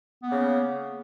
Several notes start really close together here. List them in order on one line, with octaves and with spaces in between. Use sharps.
B3 A#3 C#3